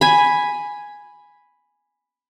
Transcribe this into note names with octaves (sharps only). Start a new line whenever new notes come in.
G#5 B5